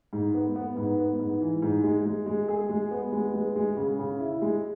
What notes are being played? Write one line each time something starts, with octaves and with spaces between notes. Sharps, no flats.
G#2
B3
B3
G#2
B3
G#2
E3
G#2
G#3
G#3
G#3
G#4
G#3
B3
G#3
G#3
G#3
C#3
C#3
E4
G#3